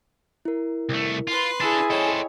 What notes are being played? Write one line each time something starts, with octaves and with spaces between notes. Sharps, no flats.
E4 A#4
C2 A3
F4 B4 C6
D4 E4 G#4 A4 A6
A4 C5 C#5 D#5 G5 G#5